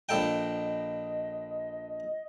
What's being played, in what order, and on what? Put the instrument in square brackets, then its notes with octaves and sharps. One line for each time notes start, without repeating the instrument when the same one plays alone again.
[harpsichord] A#1 A4 G5 [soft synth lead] D#5